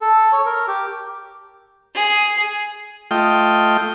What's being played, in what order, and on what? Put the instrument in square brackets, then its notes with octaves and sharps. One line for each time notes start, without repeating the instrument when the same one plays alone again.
[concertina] A4
C#5
A#4
G4
[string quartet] G#4
[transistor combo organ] A3 F4 D#5 G5